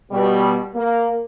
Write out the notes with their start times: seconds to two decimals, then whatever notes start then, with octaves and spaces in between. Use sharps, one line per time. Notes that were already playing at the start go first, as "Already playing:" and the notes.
0.11 B2 G3
0.75 A#3